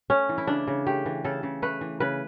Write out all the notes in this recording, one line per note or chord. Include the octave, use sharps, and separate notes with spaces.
A3 C#4
E3
E4
C#3 D4
C#3
A3 G4
E3
C#3 A4
C#3
A3 B4
E3
C#3 B4